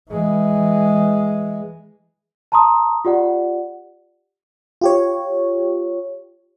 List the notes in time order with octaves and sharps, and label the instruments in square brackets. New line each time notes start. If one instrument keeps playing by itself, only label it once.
[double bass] E3 G#3
[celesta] A5 A#5 C6 D#6
F4 G4 D5 F#5
[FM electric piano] F4 G4 C#5